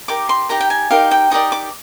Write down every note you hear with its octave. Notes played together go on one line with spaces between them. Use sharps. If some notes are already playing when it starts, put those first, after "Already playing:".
D#4 G4 A#4 D6
C6
D#4 G4 A#4 A#5
G5
G#5
D#4 G4 A#4 F5
G5
D#4 G4 A#4 D5 D#6
D6